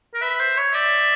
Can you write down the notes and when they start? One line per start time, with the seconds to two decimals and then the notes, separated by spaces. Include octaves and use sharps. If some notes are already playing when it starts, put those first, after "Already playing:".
0.14 A#4
0.22 B4 E5
0.40 C5
0.58 C#5
0.74 D5 E5